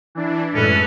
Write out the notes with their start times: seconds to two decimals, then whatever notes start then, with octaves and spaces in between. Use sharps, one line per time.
0.15 E3 D4
0.54 F#2 A2 G#3 C#4 A4 B4